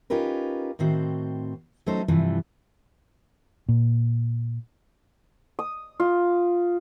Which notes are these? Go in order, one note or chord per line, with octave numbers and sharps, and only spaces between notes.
C#4 D#4 F4 G4 A#4 B4
A2 D#3 C4 F#4 C5
F#3 A3 C#4 D#4 A4 C5
G2 C3 E3 F3
A#2
D#6
F4